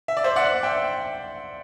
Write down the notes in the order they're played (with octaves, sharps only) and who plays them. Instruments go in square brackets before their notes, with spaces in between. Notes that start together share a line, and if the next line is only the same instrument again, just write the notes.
[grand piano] E5
D5
C5 E5
D5 F#5
E5 G5